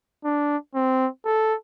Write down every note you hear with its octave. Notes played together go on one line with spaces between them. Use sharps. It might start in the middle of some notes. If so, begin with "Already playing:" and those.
D4
C4
A4